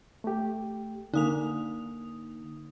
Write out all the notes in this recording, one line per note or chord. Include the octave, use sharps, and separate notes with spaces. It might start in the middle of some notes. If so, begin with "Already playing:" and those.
A3 G4
D3 A#3 D#4 D#6 F7